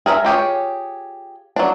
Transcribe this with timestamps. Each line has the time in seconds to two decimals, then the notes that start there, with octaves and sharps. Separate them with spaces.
0.06 G#4 A#4 D#5 E5
0.24 F4 G4 G#4 C#5
1.56 F#3 D4